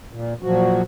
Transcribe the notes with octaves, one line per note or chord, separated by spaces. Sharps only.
A#2
A#2 F3 F#3 F#4